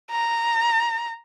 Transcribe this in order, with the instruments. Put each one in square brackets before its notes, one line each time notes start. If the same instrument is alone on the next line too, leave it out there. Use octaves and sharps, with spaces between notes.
[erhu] A#5